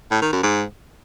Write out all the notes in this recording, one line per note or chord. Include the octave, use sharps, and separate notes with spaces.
A2
D#3
F#2
G#2